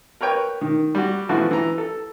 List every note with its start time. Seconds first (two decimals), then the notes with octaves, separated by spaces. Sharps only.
0.21 A#4 B4 C#5 G5
0.61 D#3
0.95 G3 F#4
1.29 E3 F3 A3 B3 F#4
1.51 E3 A#5
1.78 A4